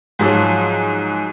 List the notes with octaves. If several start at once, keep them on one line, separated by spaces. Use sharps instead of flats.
G#2 F3 F#3